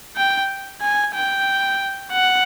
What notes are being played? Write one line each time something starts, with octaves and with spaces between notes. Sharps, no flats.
G5
G#5
G5
F#5